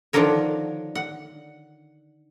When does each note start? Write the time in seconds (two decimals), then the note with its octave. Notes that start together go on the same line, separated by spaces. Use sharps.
0.13 D3 D#3 F3 D4 A#4 C#5
0.95 F#5